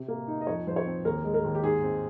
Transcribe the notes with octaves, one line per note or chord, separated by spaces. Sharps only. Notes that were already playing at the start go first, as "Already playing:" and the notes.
Already playing: C3
A#3
D#4
D#5
F2 C#5
F3 C5
C#5
C4
D#2 A#4
G#3
A#4
D#2
G4
G#2 G#4
C4